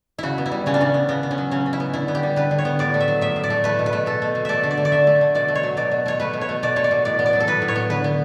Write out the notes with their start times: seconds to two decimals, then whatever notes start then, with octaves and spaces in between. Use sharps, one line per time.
0.18 C#3 E4 F#4
0.38 B3
0.46 E4
0.52 G3
0.66 C#3 C#4
0.74 D4
0.80 C#3 C#4
0.94 B3
1.09 C#3 B3
1.23 B3
1.31 C#4
1.38 F#3
1.51 C#3 C#4
1.66 C#3
1.73 E4
1.80 B3
1.93 D3 E4
2.08 B3
2.15 G4
2.23 G3
2.36 D3 B4
2.51 D3
2.58 C#5
2.65 B3
2.79 A2 D5
2.94 A3
3.00 E5
3.08 F#3
3.21 A2 E5
3.36 A2
3.44 D5
3.50 A3
3.64 A3 B4
3.79 B2
3.86 B4
3.93 A3
4.06 B2 A4
4.22 A3
4.35 B2
4.45 A3 D5 E5
4.64 D3
4.71 D5
4.77 A3
4.85 D5
4.92 D3 E5
5.07 A3
5.21 D3
5.35 B2 D5
5.48 A3
5.55 C#5
5.63 F#3
5.77 B2 D5
5.91 B2
6.06 A3 C#5
6.20 A3 B4
6.33 B2
6.41 C#5
6.49 A3
6.63 B2 D5
6.76 A3 C#5
6.84 D5
6.91 B2
7.05 A2 D5
7.19 B3
7.26 D5
7.33 F#3
7.40 A4
7.47 A2 B4
7.62 A2
7.68 C#5
7.76 B3
7.90 D3 B4
8.04 B3